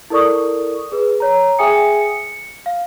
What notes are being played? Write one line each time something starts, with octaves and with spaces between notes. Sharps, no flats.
E4 A4 A#4 D5 C#6 D#6
G#4 B4
C#5 A#5
G#4 E5 G5 G#5 D#6 C#7
C#7
F5